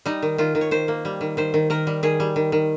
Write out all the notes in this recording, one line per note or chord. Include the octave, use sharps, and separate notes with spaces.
G3 D#4
D#3
D#3 F4
D#3
C#5
D#3 C5
A#3
G3
D#3
D#3 C5
D#3
D#3 A#4
G3
D#3 G#4
G3
D#3
D#3